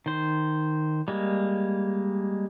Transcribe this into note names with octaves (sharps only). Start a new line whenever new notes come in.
D#3 C5
G3 G#3 A#3